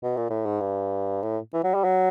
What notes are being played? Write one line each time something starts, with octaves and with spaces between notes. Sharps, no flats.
B2
A#2
A2
G#2
G2
A2
E3
F#3
G3
F#3